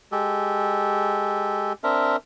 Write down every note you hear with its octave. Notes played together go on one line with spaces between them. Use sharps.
G#3 G4 A4
C4 D4 A#4 E5